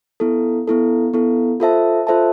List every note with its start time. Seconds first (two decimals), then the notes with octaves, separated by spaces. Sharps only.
0.20 B3 E4 A4
0.67 B3 E4 A4
1.14 B3 E4 A4
1.60 F4 A4 C5 E5 A5
2.07 F4 A4 C5 E5 A5